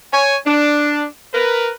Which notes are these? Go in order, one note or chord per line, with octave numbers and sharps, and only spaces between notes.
C#5 G#5
D4
A#4 B4